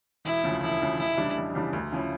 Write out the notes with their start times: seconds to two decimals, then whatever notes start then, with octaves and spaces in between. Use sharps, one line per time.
0.25 E1 E4
0.44 D2 C#3 F3
0.62 E1 E4
0.81 D2 C#3 F3
0.99 F1 E4
1.17 E2 C#3 G3 D4
1.36 F1
1.54 E2 C#3 G3 D4
1.73 D2
1.92 C#3 F3 C#4 E4